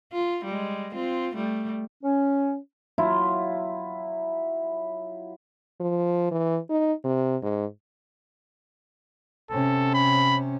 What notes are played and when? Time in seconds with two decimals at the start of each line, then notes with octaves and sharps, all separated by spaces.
0.12 F4
0.44 G3 G#3
0.95 C4 F4
1.35 G3 A3
2.02 C#4
2.98 F#3 E4 F4
5.80 F3
6.31 E3
6.70 D#4
7.04 C3
7.43 G#2
9.50 C3 C#4 A4
9.94 B5